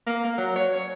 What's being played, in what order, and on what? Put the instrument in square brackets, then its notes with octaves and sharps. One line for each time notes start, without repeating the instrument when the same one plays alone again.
[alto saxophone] A#3
A#3
F#3
C#5
C#5